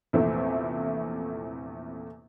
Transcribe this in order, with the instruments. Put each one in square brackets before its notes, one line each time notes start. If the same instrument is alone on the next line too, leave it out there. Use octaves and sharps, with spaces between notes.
[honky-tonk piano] A#1 E2 C3 A3 E4 C5